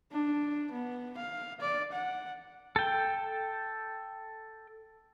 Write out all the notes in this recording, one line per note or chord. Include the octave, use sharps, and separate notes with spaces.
D4
B3
F5
D5
F#5
A4 G5